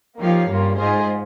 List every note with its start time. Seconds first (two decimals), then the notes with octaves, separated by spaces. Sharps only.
0.19 F3 A#3 D#4 G4 C#5 F5
0.48 G2 A#3 C#4 F4
0.78 G#2 F4 G#4 C5 D#5 G#5